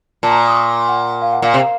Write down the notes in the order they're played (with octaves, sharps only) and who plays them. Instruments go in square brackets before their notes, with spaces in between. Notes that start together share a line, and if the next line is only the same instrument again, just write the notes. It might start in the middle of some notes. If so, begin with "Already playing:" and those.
[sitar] A#2 [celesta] A5
[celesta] A#5
D#6
C#6
F#5
F5
F#5
[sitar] A#2 [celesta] F5
[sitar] C3